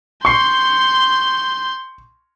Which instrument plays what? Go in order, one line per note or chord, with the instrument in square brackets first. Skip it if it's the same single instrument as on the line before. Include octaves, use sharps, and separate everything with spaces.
[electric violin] C6 G6 [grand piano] C#6 C7